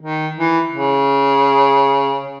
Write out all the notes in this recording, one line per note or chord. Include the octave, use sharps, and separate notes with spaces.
D#3
E3
C#3